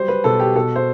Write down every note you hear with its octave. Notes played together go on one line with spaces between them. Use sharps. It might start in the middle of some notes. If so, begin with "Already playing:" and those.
Already playing: F#3 G3 C5
B4
B2 A4
G4
B2 A4
C5